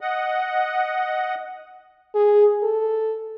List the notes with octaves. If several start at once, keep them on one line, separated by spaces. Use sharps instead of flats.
D#5 F#5
G#4
A4